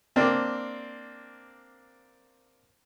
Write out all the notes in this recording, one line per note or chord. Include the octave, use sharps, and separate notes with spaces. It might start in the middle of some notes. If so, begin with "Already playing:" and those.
A#3 C4 D4